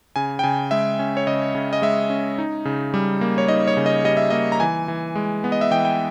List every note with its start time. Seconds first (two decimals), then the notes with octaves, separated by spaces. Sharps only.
0.16 C#3 G#5
0.39 G5
0.43 C#3 G#5
0.71 G#3 E5
0.99 C#4
1.17 C#5
1.27 C#3 D#5
1.55 C#3
1.73 D#5
1.82 G#3 E5
2.10 C#4
2.38 D#4
2.65 C#3
2.94 G3
3.21 A#3
3.38 C#5
3.48 D#4 D#5
3.67 C#5
3.77 C#3
3.86 D#5
4.04 G3 D#5
4.17 E5
4.30 A#3 D#5
4.52 A#5
4.60 E3 G#5
4.88 E3
5.16 G#3
5.44 B3
5.52 D#5
5.61 E5
5.71 E3 G5
5.85 G5